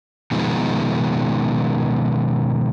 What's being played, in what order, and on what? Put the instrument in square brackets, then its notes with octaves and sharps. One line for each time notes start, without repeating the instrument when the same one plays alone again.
[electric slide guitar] B2 D#3 F3 G#3